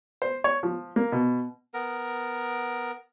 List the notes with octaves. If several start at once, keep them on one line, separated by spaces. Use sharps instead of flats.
C5
C#5
F3
A#3
B2
B3 A#4